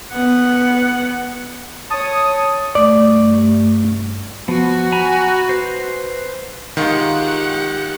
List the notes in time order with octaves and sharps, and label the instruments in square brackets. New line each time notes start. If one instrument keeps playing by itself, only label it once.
[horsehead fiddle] B3 F#5
[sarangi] C#5 [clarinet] A5 [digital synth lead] D#6
[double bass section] G2 [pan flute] A3 [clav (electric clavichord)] D5
[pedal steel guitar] F3 B3 [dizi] F#4
[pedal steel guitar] G#5 A#5 B5
B4 C5
[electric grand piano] D#3 [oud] G#3 F4 [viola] G4 F#5